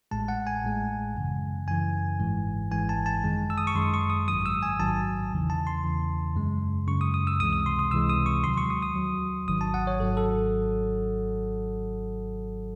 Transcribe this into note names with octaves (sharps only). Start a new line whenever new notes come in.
A1 A2 G#3 A5
F#5
G#5
A1 A2 G#3
F#2 C#3 E3
F#2 C#3 E3 G#5
G#1 G#2 E3 G#3
G#1 G#2 E3 G#3 G#5
A5
A5
F#2 D#3 G#3
E6
D#6
C#6
F#2 D#3 G#3 C6
C#6
D#6
A1 G#2 D#3 F#3 D#6
E6
G#5
A1 G#2 D#3 F#3 A5
E2 C#3 E3
A5
C6
E2 C#3 E3
F#2 C#3 G#3
F#2 C#3 G#3 C#6
D#6
D#6
E6
C#2 C3 E3 G#3 D#6
D#6
C6
D#6
C#2 C3 E3 G#3 E6
D#6
C#6
D#2 D#3 F#3 C6
C#6
D#6
D#6
D#2 D#3 F#3
G#1 G#2 D#3 F#3 D#6
A5
F#5
C#5
G#1 G#2 D#3 F#3 A4
A4